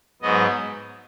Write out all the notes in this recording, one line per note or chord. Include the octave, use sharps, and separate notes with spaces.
G#2 F#3 B3 D#5